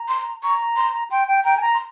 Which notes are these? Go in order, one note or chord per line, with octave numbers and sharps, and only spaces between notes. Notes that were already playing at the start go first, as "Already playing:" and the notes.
Already playing: A#5
C6
A#5 C#6
C6
G5 C6
G5
G5 A#5
G#5
A#5
C6